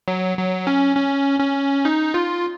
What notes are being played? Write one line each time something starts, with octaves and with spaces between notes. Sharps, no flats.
F#3
F#3
C#4
C#4
C#4
D#4
F4